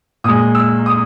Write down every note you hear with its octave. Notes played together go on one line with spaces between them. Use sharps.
A#2 G#3 D#6
E6
D#6